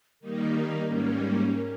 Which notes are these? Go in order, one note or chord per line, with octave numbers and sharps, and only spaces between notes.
D#3 G3 A#3 D#4 A#4
G#2 G3 A#3 C#4
A#4